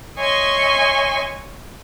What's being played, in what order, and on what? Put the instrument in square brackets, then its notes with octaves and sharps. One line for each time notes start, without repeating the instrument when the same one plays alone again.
[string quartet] C#5 D#5 E5 G#5 C6 C#6